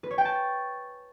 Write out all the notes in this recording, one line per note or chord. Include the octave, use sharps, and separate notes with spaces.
B4
C#5
G5
A5